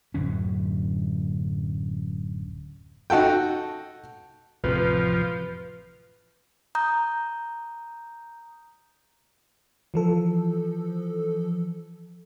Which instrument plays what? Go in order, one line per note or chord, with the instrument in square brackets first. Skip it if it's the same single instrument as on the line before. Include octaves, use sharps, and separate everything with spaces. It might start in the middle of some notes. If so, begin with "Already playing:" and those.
[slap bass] D1 F#2 D3 C#4
[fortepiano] D#4 F#4 A4 G5
[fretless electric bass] A1 F2 C3 [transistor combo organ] F3 [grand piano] B4
[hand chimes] A#5 D#6 G6
[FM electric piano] E3 F3 A4